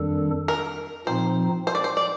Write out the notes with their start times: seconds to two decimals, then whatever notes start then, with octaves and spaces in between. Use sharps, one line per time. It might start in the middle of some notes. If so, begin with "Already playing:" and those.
Already playing: F2 D#3 G3 D4 A4
0.48 A#4
1.07 A#2 F3 C4 D#4 C5
1.67 C5
1.75 D5
1.84 C5
1.97 D5